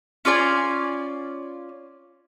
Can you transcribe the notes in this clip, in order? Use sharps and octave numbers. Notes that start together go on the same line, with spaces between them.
C#4 F4 D5 G#5